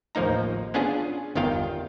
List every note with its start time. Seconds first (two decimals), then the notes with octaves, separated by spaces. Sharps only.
0.15 A1 D#2 F3 A#3 D#4 A#5
0.74 B3 C#4 D4 F4 G#4
1.35 G1 E2 D#3 F4 F5 G5